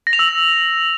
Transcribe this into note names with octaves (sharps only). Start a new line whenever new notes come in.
A#6
F7
E6